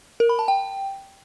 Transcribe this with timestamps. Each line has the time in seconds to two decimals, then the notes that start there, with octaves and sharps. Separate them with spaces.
0.20 A#4
0.29 B5
0.39 A5
0.48 G5